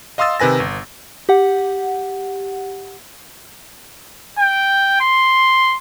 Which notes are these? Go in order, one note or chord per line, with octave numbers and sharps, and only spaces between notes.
D#5 F5 C6 D#6 E6 A6
C3 D#3 B4 G#5 A#6
G1
G4 F#5
G5
C6